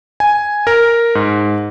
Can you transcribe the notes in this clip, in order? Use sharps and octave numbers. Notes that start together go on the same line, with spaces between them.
G#5
A#4
G#2